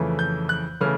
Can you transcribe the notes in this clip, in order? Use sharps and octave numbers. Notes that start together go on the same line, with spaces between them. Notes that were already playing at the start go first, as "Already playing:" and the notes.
Already playing: F2 C#3 E3 A3
G6
F#6
C#3 E3 A3 F6